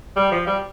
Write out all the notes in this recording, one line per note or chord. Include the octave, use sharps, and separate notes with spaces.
G3
F3
G3